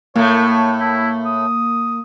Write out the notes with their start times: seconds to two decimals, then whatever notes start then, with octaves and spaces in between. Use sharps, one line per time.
0.16 A2 A3 A#3 C#5
0.80 E4
1.26 D#6